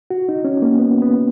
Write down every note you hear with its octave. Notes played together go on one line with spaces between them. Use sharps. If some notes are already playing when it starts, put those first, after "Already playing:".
F#4
D#4
C#4
A#3
B3
B3